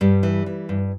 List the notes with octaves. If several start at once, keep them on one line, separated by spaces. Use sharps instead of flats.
G2 G3
E3
E3
G2